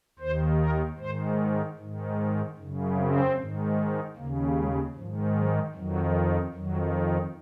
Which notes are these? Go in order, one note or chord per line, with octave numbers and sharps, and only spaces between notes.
D#2 D#3 C5
A#4
G#2 D#3 C5
G#2 D#3
F#2 C#3
C4
G#2 D#3
D#2 C#3 A#3
G#3
G#2 D#3 F3
F#3
F2 D#3 F#3
F2 D#3 F#3